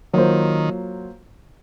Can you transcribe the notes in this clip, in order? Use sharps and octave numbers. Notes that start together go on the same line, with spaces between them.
D#3 F#3 A#3 F4 C5